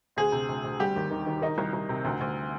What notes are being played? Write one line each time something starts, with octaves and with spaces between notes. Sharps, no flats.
D2 G#4
C3
D2
D2
G3 G4
D#2
D#3
D#3
D#3 D#4
C2
C2
C3
D2
D2